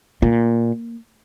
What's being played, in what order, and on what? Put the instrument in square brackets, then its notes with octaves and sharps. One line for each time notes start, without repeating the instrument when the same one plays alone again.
[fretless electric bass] A#2 [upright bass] A#3